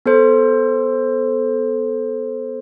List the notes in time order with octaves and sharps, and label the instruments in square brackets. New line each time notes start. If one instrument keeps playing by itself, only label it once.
[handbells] B3 A4 C5